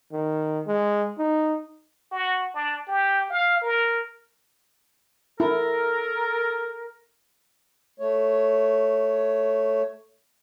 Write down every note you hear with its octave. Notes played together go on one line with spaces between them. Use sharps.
D#3
G#3
D#4
F#4
D4
G4
F5
A#4
E4 A4 A#4
A3 C#5